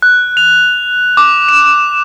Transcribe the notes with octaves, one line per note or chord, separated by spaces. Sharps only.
F#6
F7
D6
E7